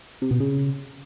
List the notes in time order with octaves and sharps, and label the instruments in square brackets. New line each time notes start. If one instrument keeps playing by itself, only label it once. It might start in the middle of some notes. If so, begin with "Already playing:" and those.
[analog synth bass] C3
B2
C#3